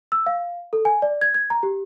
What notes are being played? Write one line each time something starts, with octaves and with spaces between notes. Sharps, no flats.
E6
F5
A4
G#5
D5
G#6
G#6
A#5
G4